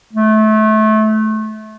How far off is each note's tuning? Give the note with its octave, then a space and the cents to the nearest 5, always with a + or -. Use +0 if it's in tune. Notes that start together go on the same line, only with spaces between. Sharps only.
A3 -25